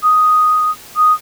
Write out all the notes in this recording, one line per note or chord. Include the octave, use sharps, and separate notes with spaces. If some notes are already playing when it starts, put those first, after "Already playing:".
D#6
D#6